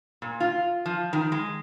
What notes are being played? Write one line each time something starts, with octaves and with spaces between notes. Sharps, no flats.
A#2
F4
F3
D#3
G#3